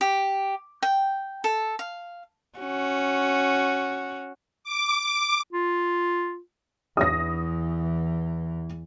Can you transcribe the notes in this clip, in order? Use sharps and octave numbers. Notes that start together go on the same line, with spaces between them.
G4
G5
A4
F5
C#4 F#4
D6
F4
E2 E3 D#6 A#6